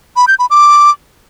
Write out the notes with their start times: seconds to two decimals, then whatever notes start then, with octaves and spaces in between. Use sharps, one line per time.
0.16 B5
0.28 G6
0.39 B5
0.50 D6